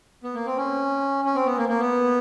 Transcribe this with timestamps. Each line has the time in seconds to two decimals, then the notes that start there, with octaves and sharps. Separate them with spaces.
0.23 B3
0.35 A#3
0.46 C4
0.57 C#4
1.25 C#4
1.35 C4
1.46 B3
1.58 A#3
1.69 A#3
1.80 B3